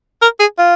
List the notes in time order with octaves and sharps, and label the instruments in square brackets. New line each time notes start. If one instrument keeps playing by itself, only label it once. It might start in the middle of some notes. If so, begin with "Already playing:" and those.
[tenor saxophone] A#4
G#4
F4